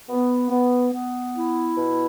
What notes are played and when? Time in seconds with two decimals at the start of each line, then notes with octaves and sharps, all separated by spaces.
0.09 B3
0.50 B3
0.92 B3
1.34 E4
1.75 B2